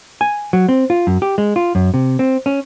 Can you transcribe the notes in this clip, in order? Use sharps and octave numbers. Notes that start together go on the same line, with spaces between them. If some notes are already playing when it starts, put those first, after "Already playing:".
G#5
F#3
C4
F4
F#2
G4
G#3
F4
F#2
C3
C4
C#4